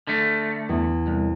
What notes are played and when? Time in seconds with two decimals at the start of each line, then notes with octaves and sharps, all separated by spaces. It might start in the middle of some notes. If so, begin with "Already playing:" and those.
0.07 D3 A3 F6 A6 A#6
0.69 E2
1.07 C2